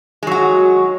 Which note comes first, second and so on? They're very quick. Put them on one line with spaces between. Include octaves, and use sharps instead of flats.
G#3 F#3 F#4